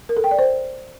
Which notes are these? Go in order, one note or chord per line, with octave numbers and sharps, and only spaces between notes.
A#4
A4
G5
D5
C5